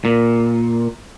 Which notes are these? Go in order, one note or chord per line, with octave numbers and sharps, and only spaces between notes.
A#2